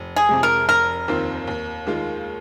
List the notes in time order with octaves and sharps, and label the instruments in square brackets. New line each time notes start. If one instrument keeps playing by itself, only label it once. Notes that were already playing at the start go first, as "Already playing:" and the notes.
Already playing: [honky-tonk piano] F1
[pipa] G#4
[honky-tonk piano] F2 C3 G#3
[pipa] A#4
[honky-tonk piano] F1 [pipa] A#4
[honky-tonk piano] D#2 D#3 C4 F4
D#2
D#3 G#3 F4